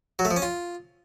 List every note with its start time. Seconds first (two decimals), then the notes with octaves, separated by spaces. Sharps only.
0.19 F#3
0.25 A3
0.31 F3
0.36 C#4
0.42 F4